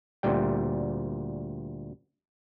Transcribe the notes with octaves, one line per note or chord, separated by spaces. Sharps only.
D2 A#2 G3 G5